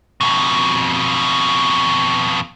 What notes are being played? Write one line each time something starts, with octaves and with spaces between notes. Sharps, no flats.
F2 B2